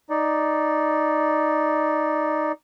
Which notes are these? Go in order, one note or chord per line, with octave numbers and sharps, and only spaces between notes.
D#4 D5